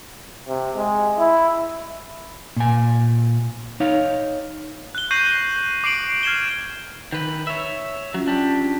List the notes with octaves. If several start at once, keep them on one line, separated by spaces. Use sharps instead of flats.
C3
G#3
E4
A#2 G#5
D#4 C#5 F5
F#6 G7
C#6 G6 A#6 C7 D#7 F#7
G6
D6 C7 D7 F#7
F6 G#6 C7 E7 G7
D#3 B4
C#5 E5
F#3 C#4 F4
D4 G4